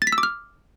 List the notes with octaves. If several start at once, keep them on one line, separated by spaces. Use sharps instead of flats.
A6
B6
E6
D6
F6